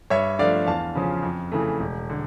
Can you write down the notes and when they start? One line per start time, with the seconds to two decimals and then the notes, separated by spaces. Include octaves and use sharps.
0.10 G2 C#5 E5
0.39 F3 A3 D4 D5 F5
0.66 E2 F5 A5
0.95 C#3 F3 C#4
1.23 F2
1.52 C#3 E3 A3
1.80 E1
2.10 D3